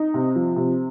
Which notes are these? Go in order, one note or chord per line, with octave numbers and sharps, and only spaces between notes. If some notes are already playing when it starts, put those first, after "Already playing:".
Already playing: D#4
C3
F3
C3